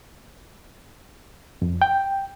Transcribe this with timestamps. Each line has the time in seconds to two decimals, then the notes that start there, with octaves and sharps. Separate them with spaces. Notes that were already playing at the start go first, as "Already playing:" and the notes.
1.62 F2
1.82 G5